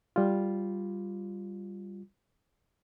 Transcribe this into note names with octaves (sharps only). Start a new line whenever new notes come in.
G3 F4